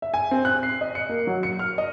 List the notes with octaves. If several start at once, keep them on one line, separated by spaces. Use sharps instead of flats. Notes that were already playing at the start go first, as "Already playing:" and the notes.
E5
G#5
C4
F#6
C7
D#5
C#7
A#3
F#3
C#7
F6
D#5